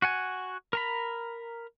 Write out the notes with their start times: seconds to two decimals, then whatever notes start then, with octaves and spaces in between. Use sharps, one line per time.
0.02 F#4 F#5 G#5
0.73 A#4 A#5 B5